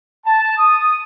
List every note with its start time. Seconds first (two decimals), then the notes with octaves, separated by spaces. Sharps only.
0.25 A5
0.57 D#6